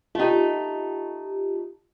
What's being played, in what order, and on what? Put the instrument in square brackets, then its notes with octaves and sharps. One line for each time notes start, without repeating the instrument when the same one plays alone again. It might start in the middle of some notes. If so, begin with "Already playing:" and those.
[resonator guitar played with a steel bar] A3 D#4 [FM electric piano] F4 G4